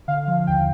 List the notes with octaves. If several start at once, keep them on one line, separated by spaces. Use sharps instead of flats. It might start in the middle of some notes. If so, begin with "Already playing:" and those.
D3 F5
F3
D#2 G5